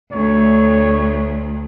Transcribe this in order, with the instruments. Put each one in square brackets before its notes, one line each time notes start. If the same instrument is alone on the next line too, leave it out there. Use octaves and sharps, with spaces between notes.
[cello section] D2 [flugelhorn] C#5